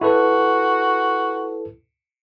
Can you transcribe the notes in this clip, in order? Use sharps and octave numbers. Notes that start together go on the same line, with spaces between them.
E4 F#4 A4 B4